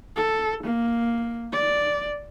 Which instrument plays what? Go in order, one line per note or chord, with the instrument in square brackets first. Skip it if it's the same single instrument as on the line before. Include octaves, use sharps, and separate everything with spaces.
[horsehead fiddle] A4
A#3
D5